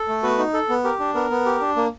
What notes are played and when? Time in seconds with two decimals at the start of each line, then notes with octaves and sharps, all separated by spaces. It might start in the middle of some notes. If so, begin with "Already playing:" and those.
Already playing: A4
0.08 A3
0.23 B3 F#4 B4
0.38 D#4
0.54 A4
0.69 B3
0.84 G4 A#4
0.99 D4
1.15 B3 A#4
1.30 B3
1.46 G4
1.61 D4
1.76 A#3